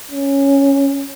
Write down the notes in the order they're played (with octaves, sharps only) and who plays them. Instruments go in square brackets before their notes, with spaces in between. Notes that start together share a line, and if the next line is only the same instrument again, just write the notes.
[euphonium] C#4